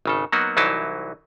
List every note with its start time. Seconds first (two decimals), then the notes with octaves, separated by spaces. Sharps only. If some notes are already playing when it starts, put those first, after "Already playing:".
0.06 G#1 C#3 A4
0.32 F#3 A#3 B3 D#4 F#4
0.57 C2 E3 F#3 D#4 E4 A5